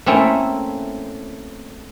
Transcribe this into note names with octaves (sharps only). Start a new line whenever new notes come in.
A3 A#3 C4 C#4 E4